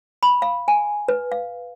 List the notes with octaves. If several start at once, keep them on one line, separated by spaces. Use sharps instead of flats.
B5
F5
G#5
B4
F5